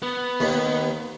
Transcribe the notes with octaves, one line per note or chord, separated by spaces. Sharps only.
B3
D#2 D#3